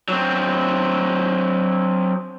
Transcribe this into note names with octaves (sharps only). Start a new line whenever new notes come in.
F#3 C4